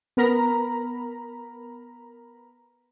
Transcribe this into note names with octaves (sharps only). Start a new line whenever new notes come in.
B3 A#4 A#5 B5